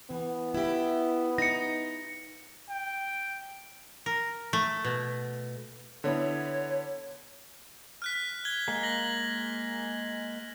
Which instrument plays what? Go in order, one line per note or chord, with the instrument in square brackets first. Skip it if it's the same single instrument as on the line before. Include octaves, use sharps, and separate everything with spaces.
[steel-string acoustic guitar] E3 [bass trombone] B3
[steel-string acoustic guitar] E4 G4
[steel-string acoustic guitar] D#4 [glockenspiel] A#6 C#7
[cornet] G5
[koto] A#4
A3
B2
[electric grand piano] D3 B3 E4 [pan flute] C#5
[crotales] F6 F#6 B6
G#6 G7
[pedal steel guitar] G#3 A#3
[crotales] A#6 F#7